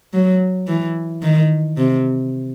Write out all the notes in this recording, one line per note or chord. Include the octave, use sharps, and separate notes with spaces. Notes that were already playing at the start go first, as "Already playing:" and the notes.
F#3
E3
D#3
C3